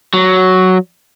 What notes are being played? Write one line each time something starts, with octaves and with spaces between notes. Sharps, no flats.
F#3